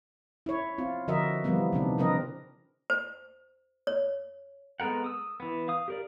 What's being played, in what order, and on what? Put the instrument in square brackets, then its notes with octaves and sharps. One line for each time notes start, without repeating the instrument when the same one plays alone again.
[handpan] E4 C#5
C4 F4
D3 F3 F#4 A#4 D#5 E5
A#2 E3 F3 G3 A#3 B3
C3 D#3 D4
C#3 F3 C4 A#4 B4 D#5
[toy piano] C5
C#5
[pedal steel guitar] G#3 B3 A4 A#4 F#5
D#6 E6
E3 B3
F5 D#6
G4 A#4 D5